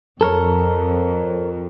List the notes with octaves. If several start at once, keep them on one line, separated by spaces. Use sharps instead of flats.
F2 A4 A#4 C#5